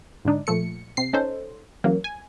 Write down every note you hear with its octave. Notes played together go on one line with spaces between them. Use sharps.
G#2 D3 D4 D#4
A#2 F3 A3 C#7
C3 C7
C#4 D#4 A4 C5
C#3 E3 F#3 A#3
G#5